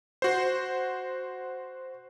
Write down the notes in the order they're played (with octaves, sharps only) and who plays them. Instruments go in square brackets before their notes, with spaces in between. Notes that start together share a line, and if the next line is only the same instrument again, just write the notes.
[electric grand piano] F#4 C5